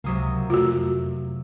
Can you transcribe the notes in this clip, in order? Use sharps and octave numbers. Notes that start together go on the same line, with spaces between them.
C#2 C3 F#3 A#3 D#6
F2 A3 F4 F#4